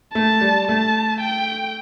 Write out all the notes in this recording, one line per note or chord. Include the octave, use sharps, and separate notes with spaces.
A3 A5
G3
A3 A5
G5